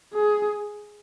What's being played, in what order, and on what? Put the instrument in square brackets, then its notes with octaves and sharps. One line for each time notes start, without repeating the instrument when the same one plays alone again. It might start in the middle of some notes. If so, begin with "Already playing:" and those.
[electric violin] G#4